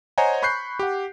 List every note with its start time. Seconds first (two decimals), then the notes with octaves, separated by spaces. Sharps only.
0.18 C5 C#5 D#5 F#5 G#5 A#5
0.42 B5 C#6 F#6 G6 C7
0.79 G4 F#5